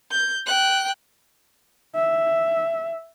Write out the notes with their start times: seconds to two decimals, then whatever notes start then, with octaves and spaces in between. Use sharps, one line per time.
0.11 G6
0.46 G5 F#6
1.95 E5